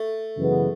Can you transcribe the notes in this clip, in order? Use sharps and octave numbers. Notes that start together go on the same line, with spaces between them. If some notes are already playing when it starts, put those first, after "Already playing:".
Already playing: A3
F#2 C#3 E3 G#3 B3